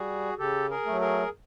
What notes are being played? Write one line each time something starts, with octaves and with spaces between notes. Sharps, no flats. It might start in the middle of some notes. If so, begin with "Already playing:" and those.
Already playing: G3 F#4 G#4
C#3 G4 A4
G#4 A#4
F#3 A3
G#4 A#4